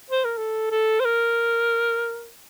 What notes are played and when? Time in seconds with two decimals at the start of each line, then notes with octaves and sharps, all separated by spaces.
0.10 C5
0.24 A#4
0.37 A4
0.71 A4
1.00 C5
1.05 A#4